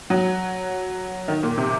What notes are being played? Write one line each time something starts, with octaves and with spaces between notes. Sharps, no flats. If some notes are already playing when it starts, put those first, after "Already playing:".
F#3
D#3
A#2
C3